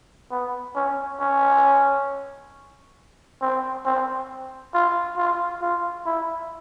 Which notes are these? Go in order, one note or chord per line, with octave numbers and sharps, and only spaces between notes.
B3
C#4
C#4
C4
C4
F4
F4
F4
E4